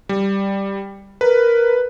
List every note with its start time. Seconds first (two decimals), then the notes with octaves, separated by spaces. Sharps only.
0.09 G3
1.21 A#4 B4